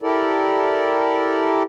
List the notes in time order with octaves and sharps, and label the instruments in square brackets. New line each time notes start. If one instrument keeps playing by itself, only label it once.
[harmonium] E4 G4 A4 A#4 D5